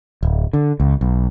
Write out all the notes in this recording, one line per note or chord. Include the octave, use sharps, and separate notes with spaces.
D1
D3
C#2
B1